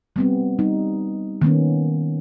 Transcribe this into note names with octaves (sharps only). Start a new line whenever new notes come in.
G3 B3 C4
G3 D#4
D#3 A#3 B3 C#4